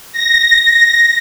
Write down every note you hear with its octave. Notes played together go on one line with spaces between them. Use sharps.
A#6